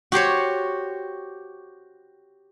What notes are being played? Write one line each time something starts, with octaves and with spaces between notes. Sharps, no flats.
F#4 G4 C5 C#5